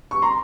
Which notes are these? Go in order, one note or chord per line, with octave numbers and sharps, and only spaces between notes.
C#6
A#5 C6